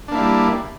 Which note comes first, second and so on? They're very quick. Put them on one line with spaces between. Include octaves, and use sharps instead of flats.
D4 A#3 E4 G3